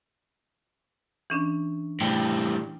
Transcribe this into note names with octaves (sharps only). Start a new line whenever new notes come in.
E3 C#4 D4
A2 G3 G5